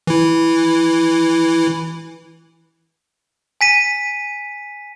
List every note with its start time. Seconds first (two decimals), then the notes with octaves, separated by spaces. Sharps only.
0.07 E3 E4
3.61 G#5 B6 D#7